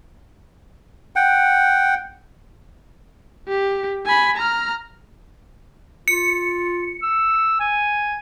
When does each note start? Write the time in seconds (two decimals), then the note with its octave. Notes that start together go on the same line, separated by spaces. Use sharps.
1.16 F#5 G5
3.48 G4
4.06 G#5 B5
4.37 A#5 F6
6.08 F4 C#7
7.02 E6
7.60 G#5